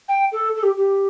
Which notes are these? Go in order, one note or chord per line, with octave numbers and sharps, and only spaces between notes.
G5
A4
A4
G4
G4